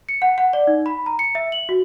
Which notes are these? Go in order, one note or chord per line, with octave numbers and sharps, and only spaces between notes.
C#7
F#5
F#5
D5
D#4
B5
A#5
C#7
E5
F#7
F#4